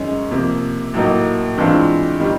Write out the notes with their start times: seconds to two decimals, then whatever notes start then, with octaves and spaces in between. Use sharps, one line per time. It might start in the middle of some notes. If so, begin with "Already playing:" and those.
Already playing: F#2 D#3 G#3 C#4
0.31 C3 F3 A#3
0.94 A2 F#3 A#3 D#4
1.57 G2 E3 G#3 C4 F4
2.20 D#3 G3